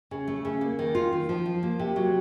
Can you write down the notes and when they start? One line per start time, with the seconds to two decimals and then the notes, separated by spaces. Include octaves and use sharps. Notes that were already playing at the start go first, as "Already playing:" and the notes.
0.11 C#3
0.28 A3
0.45 C#3
0.61 A#3
0.79 D#3
0.95 F4
1.12 D#3
1.29 F3
1.46 F4
1.63 A#3
1.79 C3
1.96 F#3